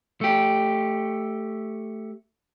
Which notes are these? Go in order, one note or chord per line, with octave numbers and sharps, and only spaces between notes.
A3 G4